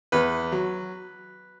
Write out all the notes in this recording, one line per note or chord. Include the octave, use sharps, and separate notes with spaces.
E2 B4
F#3